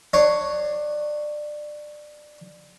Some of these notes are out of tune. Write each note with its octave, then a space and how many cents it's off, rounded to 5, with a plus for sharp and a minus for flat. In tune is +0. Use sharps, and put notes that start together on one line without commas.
D4 +20 C#5 +0